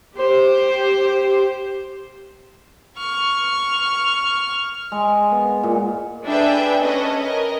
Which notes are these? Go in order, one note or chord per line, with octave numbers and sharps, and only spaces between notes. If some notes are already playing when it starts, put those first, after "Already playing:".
G4 C5
C#6 F6
G#3
B3
A#2
D4 G#4 A4 B4 E5 G5
C#4 A4 B4 D#5
A#4 D#5